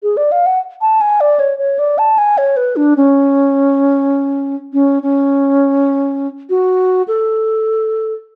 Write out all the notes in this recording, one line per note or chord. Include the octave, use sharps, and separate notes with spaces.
G#4
D5
F5
F#5
A5
G#5
D5
C#5
C#5
D5
A5
G#5
C#5
B4
D4
C#4
C#4
C#4
F#4
A4